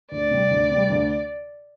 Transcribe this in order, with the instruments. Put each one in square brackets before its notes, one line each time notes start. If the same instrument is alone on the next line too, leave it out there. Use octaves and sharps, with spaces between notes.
[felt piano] D2 [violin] D5
[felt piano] C3 G3
D2
C3 G3
D2